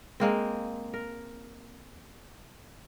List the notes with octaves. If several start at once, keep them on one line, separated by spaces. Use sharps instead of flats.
G#3 A#3 C4
A#4